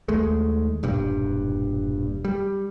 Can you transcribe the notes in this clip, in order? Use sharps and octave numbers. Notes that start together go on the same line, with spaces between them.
D#2 G#3 A3
E1 G2 A#2
G3